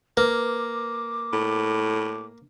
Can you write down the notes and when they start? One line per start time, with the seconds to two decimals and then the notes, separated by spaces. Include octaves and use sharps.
0.17 A#3 B4 D6
1.33 A2